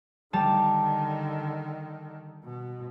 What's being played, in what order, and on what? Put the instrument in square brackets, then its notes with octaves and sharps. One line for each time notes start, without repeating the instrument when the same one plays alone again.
[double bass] D3 D#3 [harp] G3 A5
[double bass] B2